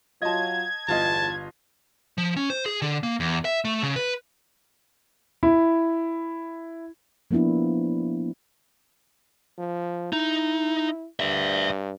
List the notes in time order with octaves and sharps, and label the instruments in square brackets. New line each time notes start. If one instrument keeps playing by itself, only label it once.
[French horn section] F#3 F4 [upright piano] D#5 A5 [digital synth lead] G#6
[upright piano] G1 F4 D#5 [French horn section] E2 [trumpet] A5
[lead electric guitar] F3
C#4
C5
G#4
D3
A#3
E2
E5
A3
C#3
B4
[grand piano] E4
[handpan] F3 A#3 B3 D4 E4
[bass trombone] F3
[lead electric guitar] D#4 [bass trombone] E4
[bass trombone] G2 [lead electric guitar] D5 E5